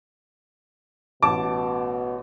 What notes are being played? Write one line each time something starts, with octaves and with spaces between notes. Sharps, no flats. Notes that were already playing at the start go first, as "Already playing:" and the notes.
A1 B2 A5 D6